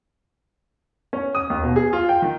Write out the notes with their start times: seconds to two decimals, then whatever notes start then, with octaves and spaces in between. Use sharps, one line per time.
1.13 C#4
1.35 D#6
1.50 D#2
1.63 B2
1.76 G#4
1.93 F4
2.09 G5
2.22 D#3